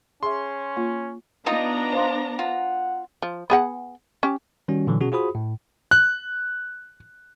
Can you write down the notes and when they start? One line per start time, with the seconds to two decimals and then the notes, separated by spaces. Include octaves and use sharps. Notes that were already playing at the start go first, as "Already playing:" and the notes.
0.23 C#4 G#4 E5 C6
0.77 A#3 F4
1.46 B3 D4 D#4 F4 D#5 A#5
1.93 C5 F5 C6
2.39 F4 F#5
3.22 F3
3.50 B3 G#4 F#5
4.23 C#4 G4
4.68 D#3 G3 C#4 F#4
4.87 A#2 D3 E3 F#3
5.01 B2 C#4 F#4 G#4
5.12 F4 F#4 G#4 C5 B5 D#6
5.35 A2
5.91 F#6